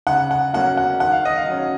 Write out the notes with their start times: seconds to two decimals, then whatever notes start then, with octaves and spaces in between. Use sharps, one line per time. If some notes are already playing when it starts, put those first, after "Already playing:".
0.07 C#3 F#5
0.31 F#5
0.53 F#3 A#3 C#4 F#5
0.77 F#5
1.00 D#3 F#5
1.12 F5
1.25 D#5
1.37 F5
1.47 F#3 C#4